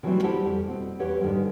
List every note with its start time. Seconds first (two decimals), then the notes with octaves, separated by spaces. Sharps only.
0.03 D#3 E3 F#3 G3 A3 C4
0.23 D2 E4 G4 C5 F#5 A5
0.41 F2 G3
0.68 B2 C4
0.99 E2 G4 B4 C#5 F#5
1.21 G#2 D3 D#3 G3 G#3